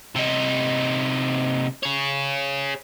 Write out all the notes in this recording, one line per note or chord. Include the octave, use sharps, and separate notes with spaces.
C3 D#4
G#4 C#5